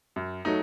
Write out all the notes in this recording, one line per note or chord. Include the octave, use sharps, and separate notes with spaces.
F#2
F#3 A3 D#4